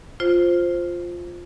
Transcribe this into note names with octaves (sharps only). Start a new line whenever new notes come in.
F4 C5